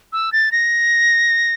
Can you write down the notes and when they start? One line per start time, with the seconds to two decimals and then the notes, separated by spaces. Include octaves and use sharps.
0.13 E6
0.33 A6
0.52 A#6